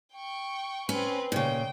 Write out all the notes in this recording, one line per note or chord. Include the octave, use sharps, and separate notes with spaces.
G5 C#6
C4 C#4 B4
A#2 C#3 G5